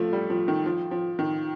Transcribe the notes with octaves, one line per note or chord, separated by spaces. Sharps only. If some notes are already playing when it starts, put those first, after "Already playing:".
Already playing: F3 A3
G3
F3
D#3
F3
F3
D#3